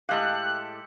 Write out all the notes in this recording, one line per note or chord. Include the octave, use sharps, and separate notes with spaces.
A2 G#3 G4 A4 F5 F#6